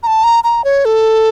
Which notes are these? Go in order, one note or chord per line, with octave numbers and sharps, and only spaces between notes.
A#5
A5
A#5
A#5
C#5
A4